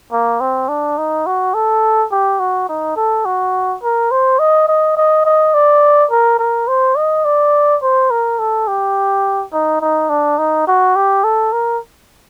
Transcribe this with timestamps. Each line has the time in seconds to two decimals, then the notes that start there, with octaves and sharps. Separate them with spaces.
0.13 A#3
0.41 C4
0.69 D4
0.98 D#4
1.27 F#4
1.54 A4
2.12 G4
2.40 F#4
2.69 D#4
2.97 A4
3.25 F#4
3.83 A#4
4.11 C5
4.39 D#5
4.68 D#5
4.97 D#5
5.26 D#5
5.54 D5
6.11 A#4
6.39 A#4
6.68 C5
6.96 D#5
7.25 D5
7.83 C5
8.11 A#4
8.39 A4
8.68 G4
9.53 D#4
9.81 D#4
10.10 D4
10.38 D#4
10.68 F#4
10.96 G4
11.24 A4
11.53 A#4